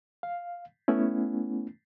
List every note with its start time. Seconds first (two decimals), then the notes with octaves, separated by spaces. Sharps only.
0.23 F5
0.88 A3 B3 C#4 E4